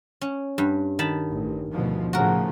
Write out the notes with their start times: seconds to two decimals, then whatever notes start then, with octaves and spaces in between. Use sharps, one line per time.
0.21 C#4
0.58 G2
0.99 D#3 A5 B5
1.29 A1
1.71 D2 B2 F3
2.13 A2 C#3 F3 F#4 A#4